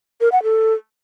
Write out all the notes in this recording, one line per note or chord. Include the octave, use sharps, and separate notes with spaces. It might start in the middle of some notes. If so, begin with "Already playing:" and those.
A#4
F#5
A4